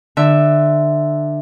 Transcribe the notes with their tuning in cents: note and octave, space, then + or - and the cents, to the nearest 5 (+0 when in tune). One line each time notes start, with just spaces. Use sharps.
D3 +20 E5 +0